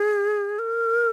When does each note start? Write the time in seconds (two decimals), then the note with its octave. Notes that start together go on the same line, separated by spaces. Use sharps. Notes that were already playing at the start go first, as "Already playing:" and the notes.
Already playing: G#4
0.59 A#4